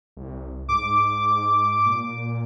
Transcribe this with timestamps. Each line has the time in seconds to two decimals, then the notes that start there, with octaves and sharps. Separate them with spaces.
0.17 C2
0.69 G#2 D6
1.86 A#2